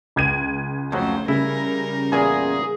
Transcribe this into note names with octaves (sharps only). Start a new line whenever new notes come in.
C#2 G#6 D#7
F2 C#3 F3 F#3 A3 C5
C#3 G3 E4 A#4
E2 A#2 G#4 G#5